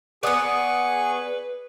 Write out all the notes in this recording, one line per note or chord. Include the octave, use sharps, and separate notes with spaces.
B3 G#4 B4 D5 F#5 C#6 D#6